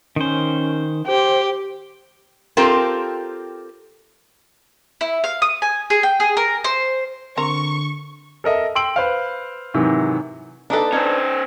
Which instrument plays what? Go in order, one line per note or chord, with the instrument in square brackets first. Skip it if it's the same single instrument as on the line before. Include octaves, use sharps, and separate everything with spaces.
[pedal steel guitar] D#3 C5 [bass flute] C#4
[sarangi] G4 [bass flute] C5
[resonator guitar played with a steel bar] C4 F4 G4 A4 A#4
[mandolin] E4
F5
D#6
G#5
G#4
G5
G#4
A#4
C5
[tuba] D3 [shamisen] C4 A#4 A#5 [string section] C#6
[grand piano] A4 A#4 D#5 E5
G5 C6 E6 D7 F#7
B4 C5 F5
G#2 C3 D#3 E3 F#3
[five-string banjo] A#3 D#4 A4 [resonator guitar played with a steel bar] D4 B4
[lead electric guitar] C#4 C5 [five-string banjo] D#4